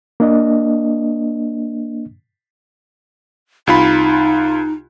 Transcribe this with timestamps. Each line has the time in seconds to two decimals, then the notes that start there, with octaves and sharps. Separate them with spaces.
0.20 A#3 D4 D#5
3.67 C2 D#4 F4 B5